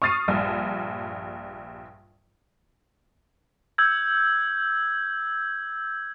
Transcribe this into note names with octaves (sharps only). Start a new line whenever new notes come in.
C#6 D#6 F6 A6 C7 D#7
A#1 G2
E6 G6 G#6